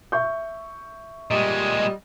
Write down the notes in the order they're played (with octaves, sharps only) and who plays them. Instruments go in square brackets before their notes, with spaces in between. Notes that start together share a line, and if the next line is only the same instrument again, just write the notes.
[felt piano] E5 C#6 G6
[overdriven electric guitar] A#2 G#3 [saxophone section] G3 D#5